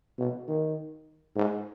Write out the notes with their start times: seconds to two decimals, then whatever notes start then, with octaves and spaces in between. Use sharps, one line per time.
0.18 B2
0.48 D#3
1.36 G#2